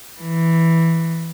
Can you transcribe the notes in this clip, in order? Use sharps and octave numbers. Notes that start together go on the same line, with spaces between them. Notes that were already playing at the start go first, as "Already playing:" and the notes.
E3